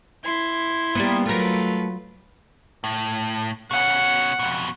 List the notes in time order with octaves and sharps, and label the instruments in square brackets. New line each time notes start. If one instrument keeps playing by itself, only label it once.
[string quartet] E4 C6 G#6
[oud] G3 A#3 B3
[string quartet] F#3 F4 B4 [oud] A3 A#4
[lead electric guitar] A2
[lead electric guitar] B2 C#4 [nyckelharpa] F#5
[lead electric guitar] F2 B2